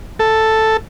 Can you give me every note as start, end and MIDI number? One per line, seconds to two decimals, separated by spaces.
0.20 0.77 69